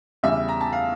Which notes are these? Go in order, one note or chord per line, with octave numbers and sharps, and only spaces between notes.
E2 C#3 G3 E5
A#5
A5
F5